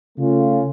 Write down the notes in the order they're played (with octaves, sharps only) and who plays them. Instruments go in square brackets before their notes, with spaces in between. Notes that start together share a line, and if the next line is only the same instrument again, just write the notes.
[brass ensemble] C#3 A3 C#4 F4